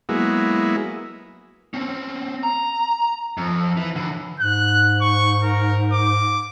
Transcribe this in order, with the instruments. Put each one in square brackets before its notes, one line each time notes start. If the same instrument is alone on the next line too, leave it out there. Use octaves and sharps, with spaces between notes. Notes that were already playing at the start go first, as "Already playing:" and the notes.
[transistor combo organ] F#3 G#3 A#3 B3 E4
[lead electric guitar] C4 C#4
A#5
F2
E3
D3 E3
[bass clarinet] G#2 [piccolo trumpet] F#6
[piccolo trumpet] C#6
A#4
D6